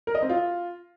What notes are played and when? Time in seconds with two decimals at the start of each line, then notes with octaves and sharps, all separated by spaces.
0.07 A#4
0.15 D#5
0.22 C4
0.29 F4